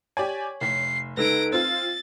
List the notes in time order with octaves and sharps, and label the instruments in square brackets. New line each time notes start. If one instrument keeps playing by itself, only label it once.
[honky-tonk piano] G4 D5 G#5 [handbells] C#5
[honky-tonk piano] F1 B6 [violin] C7
[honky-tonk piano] C#2 [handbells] D#4 A4 B4 [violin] A#6 D7
[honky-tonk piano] C4 F4 [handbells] E6 [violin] A6